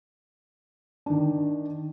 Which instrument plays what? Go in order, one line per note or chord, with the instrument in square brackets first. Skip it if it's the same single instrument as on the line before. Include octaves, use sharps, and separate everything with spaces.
[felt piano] D#3 D4